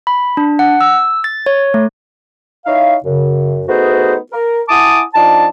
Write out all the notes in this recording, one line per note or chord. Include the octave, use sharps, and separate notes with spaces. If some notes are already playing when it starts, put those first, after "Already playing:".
B5
D4
F#5
E6
A6
C#5
A3
D#4 E4 C#5 F5
F#2 C#3
A3 B3 D#4 F#4 G#4 C5
A#4
E4 F#5 G#5 A5 D6 D#6
F3 D4 D#4 A5